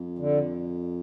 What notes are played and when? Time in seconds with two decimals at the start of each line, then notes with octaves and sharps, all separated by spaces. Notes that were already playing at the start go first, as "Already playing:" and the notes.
Already playing: F2
0.19 D3